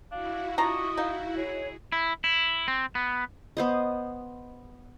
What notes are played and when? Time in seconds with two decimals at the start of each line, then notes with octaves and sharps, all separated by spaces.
0.11 D4 E4 F#4 F5
0.58 D4 F4 D#5 A#5 C#6
0.97 D#4 F5
1.37 G#4 C#5
1.92 E4
2.24 E4
2.68 C4
2.95 B3
3.57 B3 C5 D#5